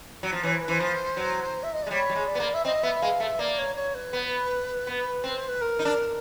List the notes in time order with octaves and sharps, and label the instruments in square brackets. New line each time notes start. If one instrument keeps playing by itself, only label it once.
[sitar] F#3
F3
[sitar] E3 [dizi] C#5
[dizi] C5
B4
[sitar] E3 [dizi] C5
[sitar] F3
F#3
[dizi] E5
D#5
[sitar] G#3 [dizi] D5
[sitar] G3 [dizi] C#5
[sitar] G3
G#3
[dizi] D5
[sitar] B3
A#3
[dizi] E5
[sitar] C4 [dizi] D#5
[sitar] B3 [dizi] E5
[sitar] G#3 [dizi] F5
[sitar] A3 [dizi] E5
[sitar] A#3 [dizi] D5
[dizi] C#5
C#5
B4
[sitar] B3
B3
C4
[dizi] C5
B4
A#4
[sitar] D#4
D4